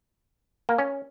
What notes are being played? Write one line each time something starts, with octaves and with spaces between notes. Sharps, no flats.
A#3
C#4